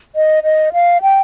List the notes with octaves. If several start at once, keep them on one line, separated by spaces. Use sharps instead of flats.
D#5
D#5
F5
G5